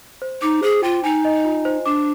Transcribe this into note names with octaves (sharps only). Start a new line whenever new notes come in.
C5
D#4 D6
G#4 C5
F4 G5
D#4 G#5
D#5
F4
C5
D4 D6